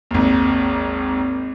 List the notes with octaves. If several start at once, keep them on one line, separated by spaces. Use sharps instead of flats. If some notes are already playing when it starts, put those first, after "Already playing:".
G#1 D#2